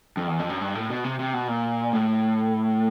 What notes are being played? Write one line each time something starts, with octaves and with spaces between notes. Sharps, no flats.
F2
E2
F2
F#2
G2
A2
B2
C3
C3
B2
A#2
A2